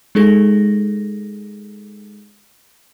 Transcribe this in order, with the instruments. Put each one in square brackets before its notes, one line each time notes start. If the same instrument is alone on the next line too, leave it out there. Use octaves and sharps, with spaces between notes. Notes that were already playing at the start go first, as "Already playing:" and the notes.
[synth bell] G#3 D#4 G#4 A4 A#6